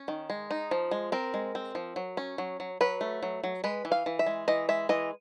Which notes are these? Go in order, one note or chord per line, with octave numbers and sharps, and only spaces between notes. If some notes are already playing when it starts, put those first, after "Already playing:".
Already playing: C#4
D#3
G#3
D#4
F3
G#3
C4 A#4
G#3
C4
F3
F#3
C#4
F#3
F#3
F#3 B4
A3
F#3
F#3
G#3 B4
E3
F5
E3
E5
G#3
E3 D#5
G#3 E5
E3 D#5